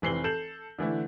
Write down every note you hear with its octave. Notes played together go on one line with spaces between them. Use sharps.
F1 E3 C4 C7 F#7 G7
A4 G6 E7 F#7
D3 E3 A3 E4